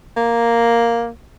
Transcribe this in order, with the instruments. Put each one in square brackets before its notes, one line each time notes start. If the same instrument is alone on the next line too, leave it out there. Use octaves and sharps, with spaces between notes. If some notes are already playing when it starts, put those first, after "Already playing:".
[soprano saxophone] A#3